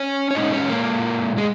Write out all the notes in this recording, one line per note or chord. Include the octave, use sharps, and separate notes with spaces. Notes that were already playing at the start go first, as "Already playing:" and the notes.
Already playing: C#4 C#5
C#5
A#2 G#3 C#4 D#4 D#5
C#4 C#5
A#3 A#4
G#3 G#4